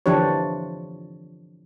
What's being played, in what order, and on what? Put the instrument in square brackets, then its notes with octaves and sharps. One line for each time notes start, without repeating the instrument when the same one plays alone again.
[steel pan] D3 E3 F3 D4 G4 C#5